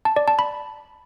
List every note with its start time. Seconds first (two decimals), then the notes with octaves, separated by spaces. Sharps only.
0.05 A5
0.16 D5
0.28 A5
0.39 B5